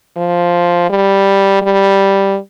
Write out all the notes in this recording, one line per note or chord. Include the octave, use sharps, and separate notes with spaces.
F3
G3
G3